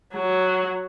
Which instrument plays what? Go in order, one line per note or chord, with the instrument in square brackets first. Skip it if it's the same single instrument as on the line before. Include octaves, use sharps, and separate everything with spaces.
[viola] F#3